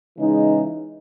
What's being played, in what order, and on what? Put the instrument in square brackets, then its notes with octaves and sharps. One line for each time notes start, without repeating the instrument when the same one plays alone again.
[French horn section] C#3 E3 G#3 D#4